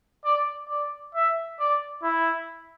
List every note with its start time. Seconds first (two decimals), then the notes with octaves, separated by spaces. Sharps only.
0.24 D5
0.69 D5
1.15 E5
1.59 D5
2.03 E4